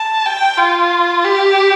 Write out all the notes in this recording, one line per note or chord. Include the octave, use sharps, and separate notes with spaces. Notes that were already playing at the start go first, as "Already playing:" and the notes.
Already playing: A5
G5
F4
G4